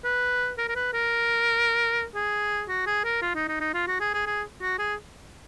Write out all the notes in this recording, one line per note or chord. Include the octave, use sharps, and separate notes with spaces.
B4
A#4
A#4
B4
A#4
G#4
F#4
G#4
A#4
F4
D#4
D#4
D#4
F4
F#4
G#4
G#4
G#4
F#4
G#4